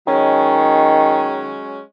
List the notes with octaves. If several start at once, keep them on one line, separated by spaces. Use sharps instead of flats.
D#3 F#3 G#3 C#4